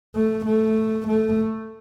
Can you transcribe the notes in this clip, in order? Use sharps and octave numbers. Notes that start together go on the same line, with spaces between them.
A3
A3
A3